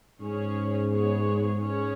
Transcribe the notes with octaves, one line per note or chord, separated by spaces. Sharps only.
G#2 C#4 G#4 C#5
G#3 B3 G#4 C#5
C#4 G#4 C#5